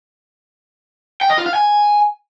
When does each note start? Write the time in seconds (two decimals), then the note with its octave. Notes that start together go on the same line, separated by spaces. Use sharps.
1.21 G5
1.30 D#5
1.38 F4
1.46 F5
1.54 G#5